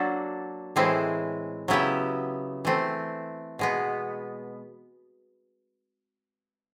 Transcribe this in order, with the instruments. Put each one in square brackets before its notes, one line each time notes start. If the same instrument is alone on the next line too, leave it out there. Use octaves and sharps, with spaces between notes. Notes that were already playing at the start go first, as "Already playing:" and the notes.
Already playing: [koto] F#3 A#3 D4 F#4 A4
A2 E3 G#3 C4 E4
C#3 F#3 B3 E4 G4
E3 A3 C4
B2 G#3 B3